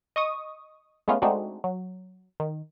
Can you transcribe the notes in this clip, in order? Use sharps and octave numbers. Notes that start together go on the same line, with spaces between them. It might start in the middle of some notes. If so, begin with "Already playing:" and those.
D#5 C#6 D#6
G#3 A3 B3 C#4 F4
G#3 A3 C4 D4 D#4 F#4
F#3
D#3